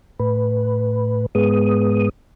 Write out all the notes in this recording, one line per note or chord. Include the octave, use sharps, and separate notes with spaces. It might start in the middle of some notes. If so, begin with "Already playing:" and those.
A2 B4
G#2 G#3 B3 D#6